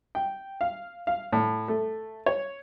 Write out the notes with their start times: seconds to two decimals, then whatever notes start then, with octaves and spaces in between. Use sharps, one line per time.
0.15 G5
0.61 F5
1.07 F5
1.33 A2
1.68 A3
2.26 C#5